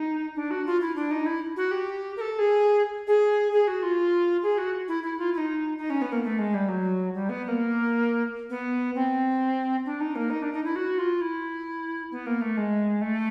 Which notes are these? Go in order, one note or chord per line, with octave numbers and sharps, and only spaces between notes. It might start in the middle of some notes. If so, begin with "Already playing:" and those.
Already playing: D#4
D4
F#4
F4
E4
D4
D#4
E4
F#4
G4
A#4
A4
G#4
G#4
G#4
F#4
F4
G#4
F#4
E4
E4
F4
E4
D#4
D#4
C#4
B3
A#3
A3
G#3
G3
F#3
G3
B3
B3
A#3
B3
C4
D4
D#4
A#3
D#4
D4
D#4
E4
F#4
F4
E4
B3
A#3
A3
G#3
A3